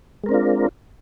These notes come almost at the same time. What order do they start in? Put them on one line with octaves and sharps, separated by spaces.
G#3 A#4 C4 D4 F4